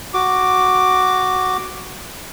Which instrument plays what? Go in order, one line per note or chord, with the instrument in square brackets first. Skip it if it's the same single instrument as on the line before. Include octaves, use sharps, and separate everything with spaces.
[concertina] F#4 D6